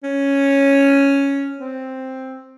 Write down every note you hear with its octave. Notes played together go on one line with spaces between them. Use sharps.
C#4
C4